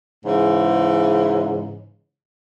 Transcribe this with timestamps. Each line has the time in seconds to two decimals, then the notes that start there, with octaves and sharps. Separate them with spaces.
0.25 G#2 C#3 E3